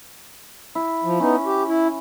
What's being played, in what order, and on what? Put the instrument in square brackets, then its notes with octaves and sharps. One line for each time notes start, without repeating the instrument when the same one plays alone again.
[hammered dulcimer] E4
[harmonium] F3
[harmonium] B3 D#4 [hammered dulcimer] C#4
[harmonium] G4
E4